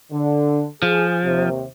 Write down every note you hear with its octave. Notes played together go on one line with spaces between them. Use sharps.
D3
F3 G#4
D#2 C3